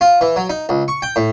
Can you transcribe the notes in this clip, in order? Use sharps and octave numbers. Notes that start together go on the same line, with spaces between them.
F4
E3
F#3
D#4
C#2
C#6
G5
A2